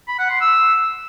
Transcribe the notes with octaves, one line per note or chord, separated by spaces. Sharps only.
B5
F#5
C6
E6